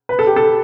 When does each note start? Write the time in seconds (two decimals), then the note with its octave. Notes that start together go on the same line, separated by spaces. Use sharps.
0.09 B4
0.19 A4
0.27 G4
0.36 A4